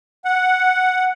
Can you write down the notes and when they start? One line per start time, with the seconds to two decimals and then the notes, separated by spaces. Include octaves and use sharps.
0.25 F#5